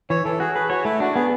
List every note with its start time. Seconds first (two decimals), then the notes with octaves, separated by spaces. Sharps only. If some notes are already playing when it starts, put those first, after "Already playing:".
0.10 E3 C#5
0.25 E3 A4
0.40 F#4 G#4
0.55 G#4 B4
0.70 F#4 C#5
0.85 A3 E4
1.00 D4 F#4
1.16 B3 G#4